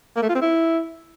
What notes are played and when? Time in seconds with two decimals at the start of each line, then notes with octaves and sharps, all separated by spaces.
0.16 A#3
0.23 A3
0.29 F4
0.35 C4
0.42 E4